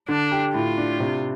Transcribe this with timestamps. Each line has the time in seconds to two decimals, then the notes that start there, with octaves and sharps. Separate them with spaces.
0.08 D3 D4
0.32 G4
0.54 A2 F4
0.78 D4
1.00 C3